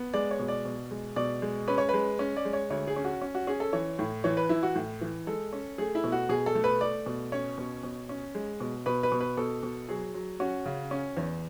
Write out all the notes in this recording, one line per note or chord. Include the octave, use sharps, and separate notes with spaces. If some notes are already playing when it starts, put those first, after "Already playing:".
Already playing: B3
G#3 D5
C#5
B2
D5
B2
G#3
B2 D5
G#3
C#4 B4
C#5
G#3 B4
C#4
D5
G#3
C#5
D2 C#5
G#4
C#4
F#4
C#4
F#4
C#4 G#4
A4
E3 C#5
A2
E3 C#5
B4
E3 E4
F#4
A2
E3
G#3 A4
C#4
A3 G#4
E4
B2
F#4
B2 G#4
A4
A3
B4
A3 D5
B2
C#4 C#5
B2
B2
C#4
G#3
B2
B2 B4
B4
B2
B4
B2 A4
B2
F#3 G#4
F#3
C#4 F#4
C#3
C#4
E2